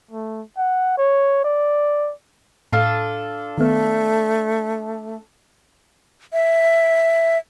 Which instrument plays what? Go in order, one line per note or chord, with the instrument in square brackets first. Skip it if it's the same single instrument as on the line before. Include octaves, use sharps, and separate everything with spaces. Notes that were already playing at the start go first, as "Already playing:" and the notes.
[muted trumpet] A3
F#5
C#5
D5
[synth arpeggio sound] A2 [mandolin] D4 F4 A4
[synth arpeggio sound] D#3 B3 [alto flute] A3
[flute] E5